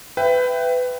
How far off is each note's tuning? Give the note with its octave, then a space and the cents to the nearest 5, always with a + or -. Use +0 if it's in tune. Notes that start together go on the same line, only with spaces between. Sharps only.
B4 +20 E5 +20 G5 +0